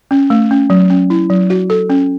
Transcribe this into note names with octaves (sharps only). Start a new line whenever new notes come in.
C#4
A3
C#4
F#3
C#4
E4
F#3
F#4
A4
C#4